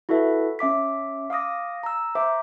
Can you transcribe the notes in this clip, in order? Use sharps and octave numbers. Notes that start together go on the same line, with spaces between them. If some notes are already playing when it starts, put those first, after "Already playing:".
E4 F#4 A4 B4 E5
C#4 E5 D6 B6
F5 D6 D#6 A#6
A#5 E6
C5 E5 A#5 D6